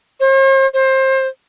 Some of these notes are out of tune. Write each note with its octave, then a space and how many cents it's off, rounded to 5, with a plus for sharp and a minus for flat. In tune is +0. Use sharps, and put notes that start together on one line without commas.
C5 +45
C5 +25